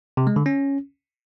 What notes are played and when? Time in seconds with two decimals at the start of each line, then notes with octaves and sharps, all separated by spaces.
0.17 C3
0.27 G#3
0.36 D3
0.46 C#4